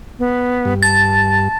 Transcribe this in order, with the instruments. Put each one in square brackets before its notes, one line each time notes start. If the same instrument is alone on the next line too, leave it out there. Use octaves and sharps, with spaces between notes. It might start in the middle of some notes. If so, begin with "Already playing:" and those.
[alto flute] B3
[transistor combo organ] G2
[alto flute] A5 [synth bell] A6